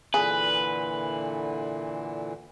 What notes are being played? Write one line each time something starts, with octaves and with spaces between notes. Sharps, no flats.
A#2 D3 E3 G#4 B4